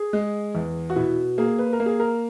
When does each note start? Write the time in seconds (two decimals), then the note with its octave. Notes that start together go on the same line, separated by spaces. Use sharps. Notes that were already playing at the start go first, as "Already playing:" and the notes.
Already playing: G#4
0.13 G#3
0.55 E2
0.90 F#4
0.96 B2 E4
1.38 A#3 G#4
1.59 B4
1.73 A#4
1.80 A#3
1.86 G#4
2.00 A#4